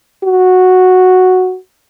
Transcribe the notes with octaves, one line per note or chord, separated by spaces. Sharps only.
F#4